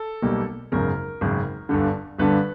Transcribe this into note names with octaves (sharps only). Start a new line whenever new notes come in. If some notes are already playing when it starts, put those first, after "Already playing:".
Already playing: A4
B1 B2 G3 A#3
G#1 F#2 C#3 A#4
G#1 F#2 C#3
G1 G2 D3
G1 G2 D3 B4